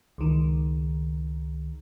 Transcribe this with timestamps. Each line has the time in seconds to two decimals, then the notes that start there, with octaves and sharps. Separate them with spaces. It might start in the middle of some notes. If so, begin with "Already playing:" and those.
0.18 C#2 D#3